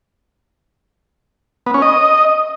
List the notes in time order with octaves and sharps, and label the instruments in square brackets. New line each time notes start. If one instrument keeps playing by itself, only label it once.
[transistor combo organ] B3
C#4
D#5